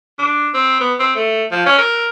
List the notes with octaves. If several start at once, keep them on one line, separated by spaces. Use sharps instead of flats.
D4
C4
B3
C4
A3
F3
C#4
A#4